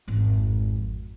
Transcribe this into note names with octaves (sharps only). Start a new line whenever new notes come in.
G#1 F2